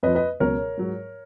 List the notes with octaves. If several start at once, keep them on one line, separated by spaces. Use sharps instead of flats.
F2 F3 B4 D#5
B4 D#5
C#2 B2 F#3 A#4 C#5
G#2 F#3